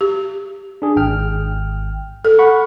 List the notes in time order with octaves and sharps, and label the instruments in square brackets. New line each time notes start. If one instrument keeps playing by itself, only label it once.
[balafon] G4
[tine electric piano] D4 G#4
G#1 G5 F6
[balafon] A4
[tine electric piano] F#5 B5 C#6